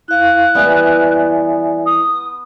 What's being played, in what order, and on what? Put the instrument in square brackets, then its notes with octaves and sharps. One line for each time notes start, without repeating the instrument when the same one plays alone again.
[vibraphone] E4 F5 [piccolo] F#6
[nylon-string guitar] E3 G3 [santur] B3 [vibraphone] D5 E5 G#5
[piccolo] D#6